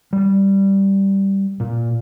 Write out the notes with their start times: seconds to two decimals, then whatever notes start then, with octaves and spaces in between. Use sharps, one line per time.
0.13 G3
1.60 A#2